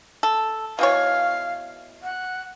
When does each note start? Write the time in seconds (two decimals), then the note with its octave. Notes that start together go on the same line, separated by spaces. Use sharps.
0.23 A4
0.79 B2 E3 C#5 F5
2.03 F#5